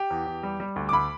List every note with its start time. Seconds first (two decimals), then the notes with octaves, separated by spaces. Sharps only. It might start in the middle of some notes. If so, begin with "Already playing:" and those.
Already playing: G4
0.10 E2
0.27 E2
0.43 G3
0.60 G3
0.76 D2
0.89 D6
0.93 D2 B5